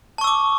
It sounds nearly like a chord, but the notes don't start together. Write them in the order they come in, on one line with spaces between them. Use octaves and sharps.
A5 C#6 E6 D6